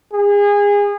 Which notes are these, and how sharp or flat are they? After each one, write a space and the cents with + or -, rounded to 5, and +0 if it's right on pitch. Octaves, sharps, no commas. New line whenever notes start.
G#4 -30